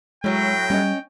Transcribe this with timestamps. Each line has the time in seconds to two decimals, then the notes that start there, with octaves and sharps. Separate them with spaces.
0.24 A2 F#3 G#3 G5
0.70 G3 C#4 D#5